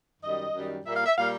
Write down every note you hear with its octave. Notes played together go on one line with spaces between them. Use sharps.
F#2 D#3 G3 D#5
F#2 D#3 G3
A#2 G3 A#3 E5
F5
E5
A#2 G3 A#3 F5